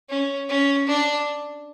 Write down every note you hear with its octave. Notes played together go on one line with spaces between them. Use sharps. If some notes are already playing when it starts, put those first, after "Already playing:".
C#4
C#4
D4